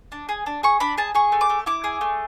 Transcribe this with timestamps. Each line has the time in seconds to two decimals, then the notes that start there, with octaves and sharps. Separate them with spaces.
0.12 D4
0.29 G#4
0.46 D4
0.63 G#4 C#6
0.80 D4 B5
0.98 G#4 A5
1.15 G#4 C#6
1.32 A3
1.41 D6
1.50 A3
1.66 E4 D6
1.84 G#4
2.01 A3